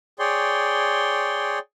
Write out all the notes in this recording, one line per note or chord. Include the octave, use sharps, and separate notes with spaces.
G#4 C#5 D5 G5 C6